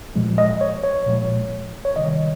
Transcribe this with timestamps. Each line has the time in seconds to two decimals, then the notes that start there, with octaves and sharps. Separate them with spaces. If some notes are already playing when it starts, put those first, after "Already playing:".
0.16 A#2 F3 G#3
0.38 D#5
0.61 C#5
0.83 C#5
1.06 A#2 F3 G#3
1.85 C#5
1.96 C3 D#3 G3 D#5